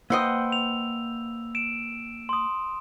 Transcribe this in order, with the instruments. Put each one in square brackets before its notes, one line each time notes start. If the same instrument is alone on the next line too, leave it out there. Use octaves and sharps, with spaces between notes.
[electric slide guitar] A#3 F#5 G5 [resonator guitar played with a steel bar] B4 C5 D#5 [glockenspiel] E6
[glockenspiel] F7
D7 E7
C6 D#6